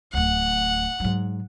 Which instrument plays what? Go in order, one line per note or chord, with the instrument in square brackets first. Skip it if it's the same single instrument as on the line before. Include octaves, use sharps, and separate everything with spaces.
[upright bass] D1 D2 [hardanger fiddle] F#5
[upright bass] G#2 F#3